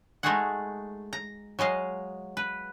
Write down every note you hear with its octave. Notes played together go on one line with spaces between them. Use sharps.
G#3 A3 D#4 F#4 G#4 F#5
A#5
F#3 G#3 D#5 F5
B4